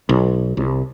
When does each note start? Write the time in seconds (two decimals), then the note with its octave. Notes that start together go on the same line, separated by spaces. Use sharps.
0.09 B1
0.57 C2